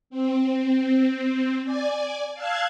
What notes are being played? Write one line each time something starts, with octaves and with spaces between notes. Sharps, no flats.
C4
D5 G#5
F5 A5 E6 F#6 G#6